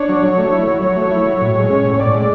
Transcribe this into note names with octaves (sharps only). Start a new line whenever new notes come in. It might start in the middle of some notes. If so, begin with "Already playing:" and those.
Already playing: D4 C#5
F#3
F#3
A3
E4
F#3
F#3 C#5
A3
E4
F#3
A2
G#3
C#4
A2
C#5
A2 D5
G#3